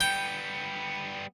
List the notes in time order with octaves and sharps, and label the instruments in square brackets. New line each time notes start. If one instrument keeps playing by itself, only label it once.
[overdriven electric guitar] G3 B3 [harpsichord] G5